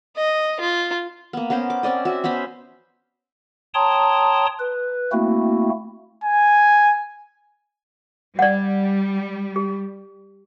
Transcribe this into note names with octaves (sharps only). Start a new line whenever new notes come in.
D#5
F4
A#3 B3
B3 C#4 A#4 C5
D6
C4 C#4 D5 D#5
F#4 E5
B3 C#4 C5 B5
C#5 G5 A5 A#5 C6 D#6
B4
A3 A#3 C4 E4 F#4
G#5
G3 D5 F#5
G4